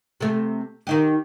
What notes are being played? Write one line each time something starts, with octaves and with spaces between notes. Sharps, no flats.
C3 A3
D#3 D#4 G4